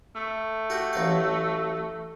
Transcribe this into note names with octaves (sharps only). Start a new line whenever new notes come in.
A3
F#4 G4
A1 F#3 F5